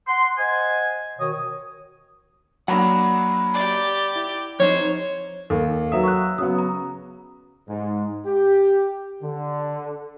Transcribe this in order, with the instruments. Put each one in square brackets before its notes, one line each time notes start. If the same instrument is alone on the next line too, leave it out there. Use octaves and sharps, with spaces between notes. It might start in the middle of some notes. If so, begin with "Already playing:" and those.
[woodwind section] F#5 C6
C5 D#5 F#5 G#5
B2 D#3 C#5 D#6
[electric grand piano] F#3 A#3 D4 [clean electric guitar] F#5 A#5 B5
[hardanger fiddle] G4 D5
[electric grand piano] E4
[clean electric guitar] F2 D#4 [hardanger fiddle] C5 [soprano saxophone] C#5
[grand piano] D#2 [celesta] A4
[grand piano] F#3 E5 [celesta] B4 D#6
[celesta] C#6 E6 F#6
[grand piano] C#3 F#3 B3 [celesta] D#6
[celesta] A#5
[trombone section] G#2
G4
D3